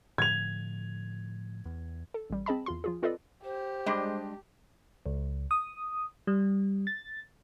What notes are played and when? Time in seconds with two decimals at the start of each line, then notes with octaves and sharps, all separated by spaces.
0.18 A2 D3 F3 G#6 F7
1.65 E2
2.14 A4
2.30 A1 G3
2.46 C4 G#4 D#5 A5 B5
2.66 E2 F4 C6
2.84 F3 F4 G#4
3.02 C4 F4 A4 B4 D5 D#5
3.44 G4 C5
3.86 G3 G#3 D4 D#5 C6
5.06 C#2
5.51 D#6
6.27 G3
6.87 A6